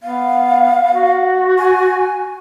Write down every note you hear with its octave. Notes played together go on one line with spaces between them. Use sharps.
B3 F5
F#4
G#5